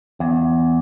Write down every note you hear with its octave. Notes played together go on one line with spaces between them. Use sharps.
E2